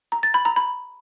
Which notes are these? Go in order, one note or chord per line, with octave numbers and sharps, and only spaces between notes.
A#5
A6
B5
A#5
B5